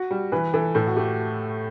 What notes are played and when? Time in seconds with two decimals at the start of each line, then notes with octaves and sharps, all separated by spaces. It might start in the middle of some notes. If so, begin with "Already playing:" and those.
Already playing: F#4
0.11 G3
0.32 E3 B4
0.54 E3 A4
0.75 A2 A4
0.87 F#4
0.96 A3 G4